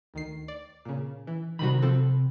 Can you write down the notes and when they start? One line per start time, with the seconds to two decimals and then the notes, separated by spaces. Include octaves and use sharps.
0.14 D2 D#3 C7
0.48 D5
0.85 A#2 C#3
1.27 E3
1.59 C3 D#3 G3 F#4 B5
1.82 F3 C4 A4